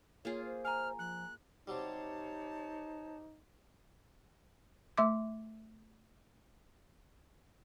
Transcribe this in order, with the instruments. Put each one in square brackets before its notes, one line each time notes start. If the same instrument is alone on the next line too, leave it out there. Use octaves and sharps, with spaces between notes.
[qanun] A#3 F4 G#4 [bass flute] C#5
[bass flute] C5
[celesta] G#5 A#5 [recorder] F6
[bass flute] F3 [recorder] F#6
[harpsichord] C3 F#3 G3 [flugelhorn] D#4 [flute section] C5 C#5 A5
[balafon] A3 E5 C6 D6